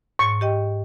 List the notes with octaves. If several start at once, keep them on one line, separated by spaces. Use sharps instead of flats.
G#2 C#6
G4 D#5 G5